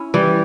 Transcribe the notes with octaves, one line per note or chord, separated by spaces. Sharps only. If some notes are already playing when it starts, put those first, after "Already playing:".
Already playing: C#4 E4
E3 G3